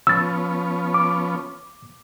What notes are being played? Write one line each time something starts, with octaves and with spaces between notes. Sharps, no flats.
F3 B3 C#4 E6 A6
D6